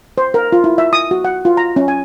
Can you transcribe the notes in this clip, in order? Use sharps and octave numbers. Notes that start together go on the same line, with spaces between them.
C5
A#4
F4
E4
E5
D#6
F#4
F#5
F4
A#5
C#4
G#5